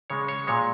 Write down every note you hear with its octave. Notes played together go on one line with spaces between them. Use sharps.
C#3 G#3 C#5
C#5
A#2 G#3 C#5